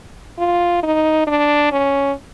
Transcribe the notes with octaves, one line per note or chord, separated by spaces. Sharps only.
F4
D#4
D4
C#4